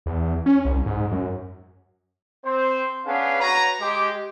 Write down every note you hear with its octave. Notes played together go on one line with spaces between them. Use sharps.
E2
C#4
C2
G#2
F#2
C4 C5
B3 C#4 D4 G#4 F5
F#4 B4 C#5 A#5
G#3 G4